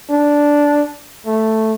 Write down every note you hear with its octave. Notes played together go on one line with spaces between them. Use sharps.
D4
A3